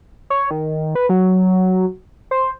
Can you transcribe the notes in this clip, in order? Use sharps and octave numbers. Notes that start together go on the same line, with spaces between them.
C#5
D#3
B4
F#3
C5